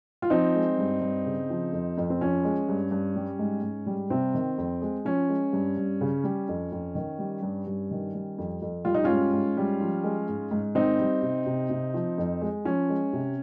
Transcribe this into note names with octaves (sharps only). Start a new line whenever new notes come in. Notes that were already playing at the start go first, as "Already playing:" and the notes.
F4
F3 C4 D#4
G#3
G2
G2
C#3
F3
F2
F2
C4
F3 C#4
G#3
G2
G2
G3
G#2
G#2
G3
C3 C4
D#3
F2
G#3
F3 C#4
G#3
G2
G2
C#3
G3
F2
F2
D#3
G3
G2
G2
D#3
G3
F2
F2
G3 F4
D#4
G#2 C#4 F4
G#2
G3
F3
G#3
G#2
G#2
D#3 C4 D#4
G3
C3
C3
C3
F3
F2
G#3
F3 C#4
G#3
C3